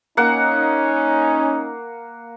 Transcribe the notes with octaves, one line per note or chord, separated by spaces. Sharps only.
A#3 C#4 D#4 F#5